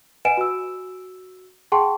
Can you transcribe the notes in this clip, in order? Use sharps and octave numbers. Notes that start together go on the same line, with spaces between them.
B4 D#5 F#5 G#5 D7 E7
F#4 E6
G#4 F#5 G5 A5 C6 C#6